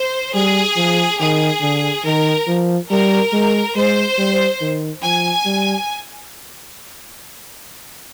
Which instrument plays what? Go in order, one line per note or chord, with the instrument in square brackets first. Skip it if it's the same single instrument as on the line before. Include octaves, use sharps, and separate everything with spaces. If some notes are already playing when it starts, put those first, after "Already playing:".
Already playing: [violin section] C5
[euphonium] G3 [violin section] G#4
[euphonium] F3
[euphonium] D#3 [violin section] G#4
[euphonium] D3
[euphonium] D#3 [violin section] A#4
[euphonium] F3
[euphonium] G3 [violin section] A#4
[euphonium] G#3
[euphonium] G#3 [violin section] C5
[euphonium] G3
D#3
[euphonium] F3 [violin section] G#5
[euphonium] G3